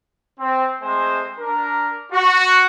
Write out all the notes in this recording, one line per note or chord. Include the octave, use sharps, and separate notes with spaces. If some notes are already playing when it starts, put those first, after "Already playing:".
C4
G#3 A3 C4 C5 G#5
D4 A#4
F#4